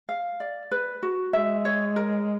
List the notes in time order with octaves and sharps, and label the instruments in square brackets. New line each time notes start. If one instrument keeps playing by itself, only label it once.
[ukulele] F5
D5
B4
F#4
[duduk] G#3 [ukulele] E5
[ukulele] C#5
A#4